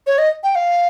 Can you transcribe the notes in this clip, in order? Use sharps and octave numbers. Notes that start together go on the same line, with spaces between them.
C#5
D#5
G5
F5